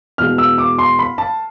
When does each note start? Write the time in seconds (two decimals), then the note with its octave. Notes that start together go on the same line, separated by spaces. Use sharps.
0.18 E2 B2 G#3 F6
0.38 E6
0.58 D6
0.79 C6
0.99 B5
1.18 A5